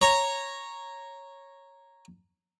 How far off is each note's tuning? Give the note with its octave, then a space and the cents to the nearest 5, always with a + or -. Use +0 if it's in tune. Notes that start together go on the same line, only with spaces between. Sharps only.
C#5 -10 A#5 +0